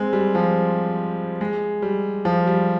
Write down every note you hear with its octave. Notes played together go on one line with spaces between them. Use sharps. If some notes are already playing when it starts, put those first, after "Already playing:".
Already playing: G#3 C4
G3
F3
G#3
G3
F3
G3